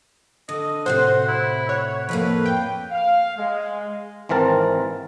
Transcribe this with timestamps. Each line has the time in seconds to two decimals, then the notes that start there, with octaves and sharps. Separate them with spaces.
0.49 D3 D#5
0.86 A2 C3 F#4 C5 F#5
1.28 E4
1.69 C#5 F#5
2.09 F2 A2 A#3 B4
2.46 G5
2.92 F5
3.38 G#3
4.29 G#1 E3 C4 A#4 A5